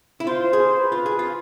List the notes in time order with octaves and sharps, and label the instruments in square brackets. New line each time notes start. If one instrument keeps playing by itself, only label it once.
[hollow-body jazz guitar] E4
[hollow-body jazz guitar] F4 [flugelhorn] C5
[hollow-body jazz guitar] G#4
[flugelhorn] B4
[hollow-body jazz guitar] F4
G#4
F4